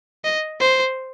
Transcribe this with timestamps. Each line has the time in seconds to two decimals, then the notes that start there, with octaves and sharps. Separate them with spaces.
0.24 D#5
0.60 C5